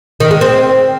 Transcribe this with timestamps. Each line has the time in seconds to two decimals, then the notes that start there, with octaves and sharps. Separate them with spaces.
0.20 D#3
0.31 G#3
0.41 C4